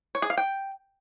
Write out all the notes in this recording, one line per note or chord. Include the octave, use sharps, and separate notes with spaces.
C#5
G#4
F5
G5